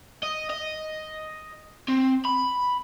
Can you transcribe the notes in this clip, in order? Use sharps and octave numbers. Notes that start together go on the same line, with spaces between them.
D#5
D#5
C4
B5